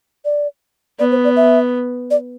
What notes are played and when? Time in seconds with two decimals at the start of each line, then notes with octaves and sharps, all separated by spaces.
0.25 D5
0.99 B3 D5
1.11 C5
1.24 D5
1.36 E5
2.11 D5